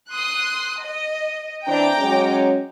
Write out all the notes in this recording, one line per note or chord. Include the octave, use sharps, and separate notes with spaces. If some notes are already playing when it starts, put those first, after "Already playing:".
C6 D#6 F#6
D#5
E3 C4 D4 G5 A#5 D6
F#3 G#3 C#4